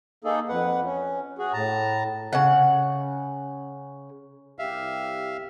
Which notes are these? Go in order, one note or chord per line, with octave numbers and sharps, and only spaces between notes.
A#3 D#4 G#4 A4
F2 B4 F#5
C#4
F#4 G#4
A2 A5 A#5
C#3 F#5
C2 G4 E5 F5